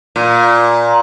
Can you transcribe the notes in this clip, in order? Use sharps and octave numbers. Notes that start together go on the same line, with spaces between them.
A#2